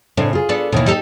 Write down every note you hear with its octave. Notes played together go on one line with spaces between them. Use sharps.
A2 C#3 C4 D4
F4 G#4
B3 D4 A4
D#2 B2 D#3 E3
D#4 G4 A4